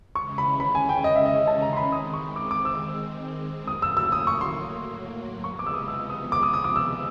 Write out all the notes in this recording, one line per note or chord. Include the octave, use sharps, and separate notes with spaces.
C#3 E3 G#3 C#4 C#6
B5
B5
G#5
G5
D#5
E5
D#5
A5
A#5
C6
B5
D#3 G#3 C4 D#6
C#6
D6
D6
E6
A2 F#3 A#3 D#6
E6
E6
D#6
C#6
C6
C3 F3 G#3 B3 C#6
D6
E6
D#6
E6
D#6
D6
D#6
D#6
D6
E6